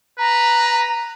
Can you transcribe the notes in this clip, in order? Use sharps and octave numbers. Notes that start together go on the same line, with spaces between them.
B4 A#5